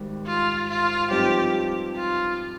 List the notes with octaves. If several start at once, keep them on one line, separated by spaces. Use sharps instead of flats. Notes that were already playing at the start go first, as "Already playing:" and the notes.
Already playing: G#1 G#2 D#3 G3
F4
F4
G2 F3 C4 D#4 G4
F4